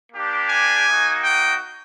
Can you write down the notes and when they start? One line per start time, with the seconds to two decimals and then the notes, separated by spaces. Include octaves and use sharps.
0.13 A#3 D4 G4
0.50 G#5
0.87 A#3 D#4 F#4
1.24 G5